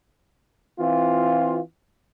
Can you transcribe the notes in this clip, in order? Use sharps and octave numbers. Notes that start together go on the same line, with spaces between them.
E3 C4 F4